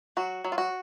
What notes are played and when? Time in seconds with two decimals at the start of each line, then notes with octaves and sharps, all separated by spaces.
0.17 F#3 F#4
0.44 F#3
0.52 F4
0.58 F#4